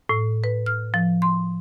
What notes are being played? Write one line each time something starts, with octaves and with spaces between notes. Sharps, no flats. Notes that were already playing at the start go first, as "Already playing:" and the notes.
A2
B4
F6
F3
C6